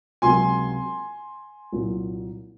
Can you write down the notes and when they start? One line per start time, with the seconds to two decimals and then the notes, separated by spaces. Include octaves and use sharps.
0.22 C#2 C3 F#3 A#3 G#5 C6
1.72 C2 A#2 F#3 A#3